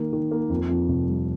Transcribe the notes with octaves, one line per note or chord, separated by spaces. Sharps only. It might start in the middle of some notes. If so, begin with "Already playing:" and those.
Already playing: D#3 A#3
D#3
A#3
F2
F2
F1
G3